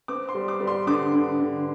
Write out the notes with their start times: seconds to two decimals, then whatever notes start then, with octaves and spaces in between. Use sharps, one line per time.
0.08 C4 D6
0.29 C6
0.35 G3
0.48 D6
0.61 G3
0.67 C6
0.87 D3 D6
1.13 D3
1.39 D3